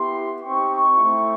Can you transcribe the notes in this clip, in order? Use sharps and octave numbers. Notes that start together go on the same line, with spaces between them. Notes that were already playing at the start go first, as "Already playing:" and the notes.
Already playing: B3 E4 G4 C6
C4 D#4 G4 C#6
A3 C4 E4